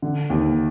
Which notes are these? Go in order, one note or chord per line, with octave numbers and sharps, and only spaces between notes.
D3
D#2